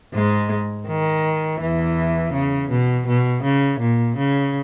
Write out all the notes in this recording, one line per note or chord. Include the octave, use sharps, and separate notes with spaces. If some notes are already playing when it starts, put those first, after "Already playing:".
G#2 G#3
D#3
E2 E3
C#3
B2
B2
C#3
A#2
C#3